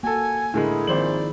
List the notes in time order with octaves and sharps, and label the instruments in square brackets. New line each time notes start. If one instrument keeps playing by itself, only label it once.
[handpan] A#3 [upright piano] F#4 A4 [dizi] G#5
[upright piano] A2 D3 G#3 [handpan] E4 G#4 A#4
[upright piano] G#1 C5 F#7 [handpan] D#3 F3 [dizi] D5